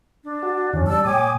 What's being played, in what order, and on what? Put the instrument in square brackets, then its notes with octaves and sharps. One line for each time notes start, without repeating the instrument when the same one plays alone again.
[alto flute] D4
[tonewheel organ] F#4
[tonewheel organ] F2 D3 E3 [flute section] C#4
[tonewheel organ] G3 [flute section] D5 A5 E6
[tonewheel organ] A#2 D#6 [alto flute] C#5 [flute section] G5 G#5 D6